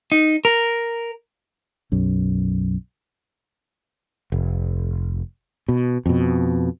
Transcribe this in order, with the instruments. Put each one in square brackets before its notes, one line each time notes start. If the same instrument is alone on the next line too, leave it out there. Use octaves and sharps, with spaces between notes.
[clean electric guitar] D#4
A#4
[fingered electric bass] B1 F#2
[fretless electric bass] F1
B2
F2 B2